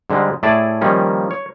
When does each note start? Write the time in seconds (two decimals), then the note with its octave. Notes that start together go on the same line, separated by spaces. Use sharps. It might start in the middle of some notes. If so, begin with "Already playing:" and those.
0.10 G#2 D3 G3 G#3
0.43 A2 E4 G#4 D5 A5
0.81 D#3 F3 G3 A#3 C#4
1.31 C#5